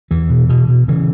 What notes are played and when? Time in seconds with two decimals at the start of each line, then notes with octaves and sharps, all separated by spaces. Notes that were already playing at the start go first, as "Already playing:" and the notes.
0.11 E2 E3
0.30 B2
0.49 B2
0.68 B2
0.88 C#3 E3